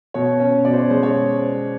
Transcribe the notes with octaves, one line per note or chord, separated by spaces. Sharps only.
B2 C#5
C#4
B2 D5
C5
C#5
G#3 C5
C#5